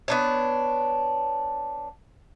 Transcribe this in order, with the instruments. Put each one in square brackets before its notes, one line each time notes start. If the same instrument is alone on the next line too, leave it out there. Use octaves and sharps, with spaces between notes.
[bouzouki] B3 D4 C#5